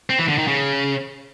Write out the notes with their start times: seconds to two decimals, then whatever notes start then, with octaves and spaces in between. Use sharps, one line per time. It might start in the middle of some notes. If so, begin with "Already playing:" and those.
0.10 C4
0.19 E3
0.29 D3
0.38 D#3
0.47 C#3